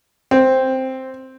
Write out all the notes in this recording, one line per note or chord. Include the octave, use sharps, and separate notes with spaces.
C4